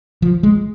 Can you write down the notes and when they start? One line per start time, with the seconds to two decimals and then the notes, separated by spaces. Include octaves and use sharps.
0.22 F3
0.43 G#3